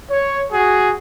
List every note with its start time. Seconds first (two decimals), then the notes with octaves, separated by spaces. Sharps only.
0.10 C#5
0.53 F#4 G#4